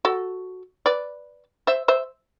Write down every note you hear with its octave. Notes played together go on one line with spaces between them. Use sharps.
F#4 A4
B4 D5
C5 E5
C5 E5